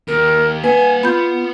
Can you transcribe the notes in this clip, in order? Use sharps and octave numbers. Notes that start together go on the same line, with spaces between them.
D#2 A#4
A#3 B4 F#5 G#5
B3 F4 B5 G6